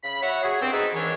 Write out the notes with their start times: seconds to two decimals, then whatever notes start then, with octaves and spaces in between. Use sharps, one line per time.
0.03 C#3 B5
0.22 F#4 C#5 E5 F#5
0.43 F#4 G#4
0.62 G2 C4
0.73 C4 D#4 G#4 A4 B4
0.94 G#2 D#3 E3 D4 C#5